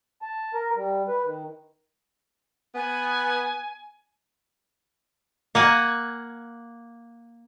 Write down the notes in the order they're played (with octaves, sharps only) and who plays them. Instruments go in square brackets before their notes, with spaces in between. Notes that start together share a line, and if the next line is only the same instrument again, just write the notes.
[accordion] A5
A#4
G3
B4
D#3
[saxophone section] B3 [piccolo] G#5
[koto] A#3 F#5 G#5